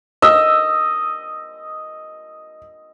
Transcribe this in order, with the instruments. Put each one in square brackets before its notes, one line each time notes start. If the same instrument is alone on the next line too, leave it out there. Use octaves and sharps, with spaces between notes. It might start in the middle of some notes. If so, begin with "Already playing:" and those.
[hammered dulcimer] D#5 [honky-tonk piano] E6